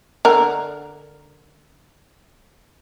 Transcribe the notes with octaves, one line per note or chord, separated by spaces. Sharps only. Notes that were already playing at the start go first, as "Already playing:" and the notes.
D3 A#4